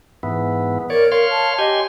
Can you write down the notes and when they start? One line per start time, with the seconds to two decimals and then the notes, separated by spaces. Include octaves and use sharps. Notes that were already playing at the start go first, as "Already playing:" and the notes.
0.23 G#2 E3 B3
0.90 A#4 C#5 D5
1.12 A#4 C#5 F5 C6
1.30 A5
1.59 G4 D#5 G#5 C6